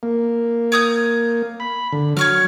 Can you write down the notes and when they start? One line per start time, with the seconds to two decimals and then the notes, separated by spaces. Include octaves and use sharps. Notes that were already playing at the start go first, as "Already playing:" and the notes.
0.03 A#3
0.72 C#5 D#6 G6
1.60 B5
1.93 D3
2.17 F#3 C#5 C#6 F6